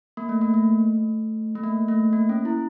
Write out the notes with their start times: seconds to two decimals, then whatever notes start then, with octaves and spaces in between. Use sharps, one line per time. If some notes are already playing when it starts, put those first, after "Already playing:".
0.17 A#3
0.29 A3
0.41 A#3
0.54 A3
1.55 A3
1.63 A#3
1.88 A3
2.13 A#3
2.29 C#4
2.45 E4